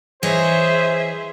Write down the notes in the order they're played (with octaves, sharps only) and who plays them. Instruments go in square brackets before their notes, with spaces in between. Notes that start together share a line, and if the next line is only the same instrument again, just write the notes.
[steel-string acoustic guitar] E3 C#5 D#5 [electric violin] G#4 E5 [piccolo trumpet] C5